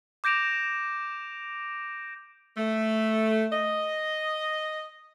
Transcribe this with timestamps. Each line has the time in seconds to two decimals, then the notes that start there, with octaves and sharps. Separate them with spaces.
0.24 D6 G6 A#6 D7 E7 F7
2.57 A3
3.51 D#5